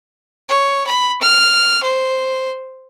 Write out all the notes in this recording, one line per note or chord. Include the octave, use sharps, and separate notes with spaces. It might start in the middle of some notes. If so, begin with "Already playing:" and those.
C#5
B5
F6
C5